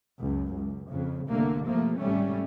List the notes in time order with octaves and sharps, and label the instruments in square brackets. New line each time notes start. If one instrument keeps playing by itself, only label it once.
[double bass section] C#2 F#2
C#2
F2 C#3
G1 C2 D3 A3 A#3
C3 F3 A3 A#3
G#1 G3 A3 C#4